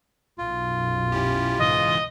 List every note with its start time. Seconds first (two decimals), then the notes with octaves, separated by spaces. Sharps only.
0.38 B1 F#2 F4
1.12 C#4 E4 G4
1.59 G#2 C#3 E3 D#5